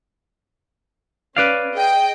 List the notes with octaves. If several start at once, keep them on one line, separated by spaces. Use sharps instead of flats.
C#4 B4 D5 F5
G#4 D#5 G5